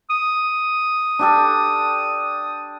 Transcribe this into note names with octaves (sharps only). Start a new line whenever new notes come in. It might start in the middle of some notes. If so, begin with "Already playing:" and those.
D#6
D4 G4 A4